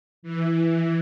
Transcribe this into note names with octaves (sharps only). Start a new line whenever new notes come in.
E3